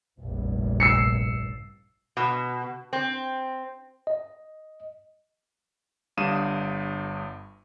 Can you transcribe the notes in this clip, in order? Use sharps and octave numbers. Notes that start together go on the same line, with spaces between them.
F1 A#1 G2
E6 C7 C#7
B2
C4
D#5
G1 G2 F5 D#6 D#7 E7